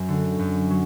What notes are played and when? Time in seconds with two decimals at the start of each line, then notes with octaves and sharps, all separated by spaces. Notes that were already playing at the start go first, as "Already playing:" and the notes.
Already playing: F#2
0.08 D3
0.39 F#2
0.70 F#3